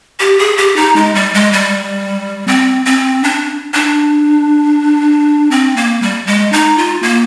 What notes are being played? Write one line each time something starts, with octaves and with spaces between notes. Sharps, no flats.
G4
G#4
G4
D#4
G#3
G3
G#3
G3
C4
C4
D4
D4
C4
A#3
G3
G#3
D#4
F4
A#3